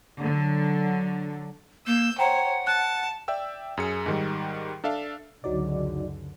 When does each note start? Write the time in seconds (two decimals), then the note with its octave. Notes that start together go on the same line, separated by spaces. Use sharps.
0.22 D3 F#3
1.87 A#3 E6 G6
2.19 C5 C#5 F#5 G5 A#5
2.67 A5 F#6
3.28 D5 E5 G5 E6
3.77 F#2 G#4 C#7
4.06 G#2 D#3 G3
4.84 D4 A4 E5 F5
5.44 C#2 F#2 D3 F#3 D#4 D5